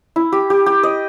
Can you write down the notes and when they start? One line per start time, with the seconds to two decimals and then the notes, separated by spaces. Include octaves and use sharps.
0.16 E4
0.32 G4
0.50 G4
0.66 G4
0.83 D#5